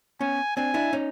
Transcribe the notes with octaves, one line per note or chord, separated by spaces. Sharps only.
B3 C#4 G#5
C4 D4 G#5
D4 E4
C#4 D#4